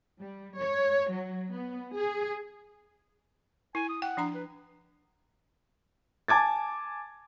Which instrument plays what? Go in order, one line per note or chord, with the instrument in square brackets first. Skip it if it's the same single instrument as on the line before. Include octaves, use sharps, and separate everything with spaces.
[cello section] G3
C#5
F#3
B3
G#4
[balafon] E4 [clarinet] G#5
[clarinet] D#6
[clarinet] F#5 [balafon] G5
[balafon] F3 D4 A#5
[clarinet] B4
[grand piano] G#5 A5 D6 G#6 A6